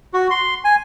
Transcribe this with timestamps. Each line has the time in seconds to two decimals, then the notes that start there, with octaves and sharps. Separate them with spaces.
0.14 F#4
0.31 C6
0.64 G#5